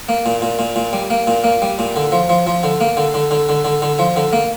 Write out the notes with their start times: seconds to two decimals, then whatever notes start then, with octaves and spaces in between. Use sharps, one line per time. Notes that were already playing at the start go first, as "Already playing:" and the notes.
0.09 A#3
0.26 A#2
0.42 A#2
0.59 A#2
0.76 A#2
0.93 G3
1.10 A#3
1.27 A#2
1.44 A#3
1.62 G3
1.79 A#2
1.96 D3
2.12 F3
2.29 F3
2.47 F3
2.63 D3
2.80 A#3
2.97 D3
3.14 D3
3.31 D3
3.49 D3
3.65 D3
3.82 D3
3.99 F3
4.16 D3
4.33 A#3